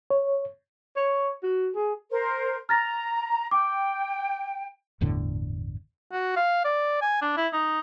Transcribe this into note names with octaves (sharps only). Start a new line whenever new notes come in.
C#5
C#5
F#4
G#4
A#4 C5
A#5 F6 A6 A#6
G5 D6
G1 E2 A2 D3
F#4
F5
D5
G#5
D4
E4
D#4